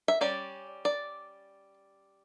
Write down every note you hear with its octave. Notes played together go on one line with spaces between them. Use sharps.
E5
G3 C#4 D5
D5